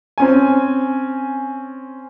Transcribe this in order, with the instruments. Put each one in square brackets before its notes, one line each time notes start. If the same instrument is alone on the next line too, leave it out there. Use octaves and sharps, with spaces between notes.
[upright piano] C4 C#4 G#5